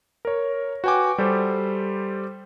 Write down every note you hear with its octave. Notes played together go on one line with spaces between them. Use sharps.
A#4 C#5
F#4 B4 G5 G#5 D6
G3 G4 A4 C5